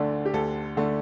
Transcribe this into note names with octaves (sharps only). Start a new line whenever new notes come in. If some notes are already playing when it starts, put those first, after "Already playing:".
Already playing: D2 D3 A3 D4
G4
D2 A4
D3 A3 D4